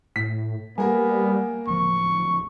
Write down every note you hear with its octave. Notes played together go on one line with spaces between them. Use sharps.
A2 B6
G3 A#3 B3 A#4 G#5
D1 C#2 F3 C#6